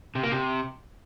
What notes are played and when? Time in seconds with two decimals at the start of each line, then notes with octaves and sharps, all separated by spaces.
0.15 C3
0.24 A#3
0.32 C3